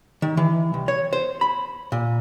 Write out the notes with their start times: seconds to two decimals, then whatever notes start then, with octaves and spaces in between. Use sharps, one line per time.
0.22 D#3
0.37 E3
0.74 C2
0.88 C#5
1.13 C5
1.41 B5
1.92 A#2